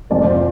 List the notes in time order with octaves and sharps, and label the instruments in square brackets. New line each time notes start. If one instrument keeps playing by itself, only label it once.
[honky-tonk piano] F2 C3 F3 A#3 D5
C5